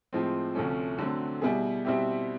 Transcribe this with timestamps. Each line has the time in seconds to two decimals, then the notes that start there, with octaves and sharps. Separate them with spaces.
0.13 A2 F3 G#3 C4
0.55 D2 C3 F3 A3 C#4
0.98 D3 F#3 A3 C4
1.42 B2 G3 B3 E4 G#4
1.85 B2 G3 C4 E4 G4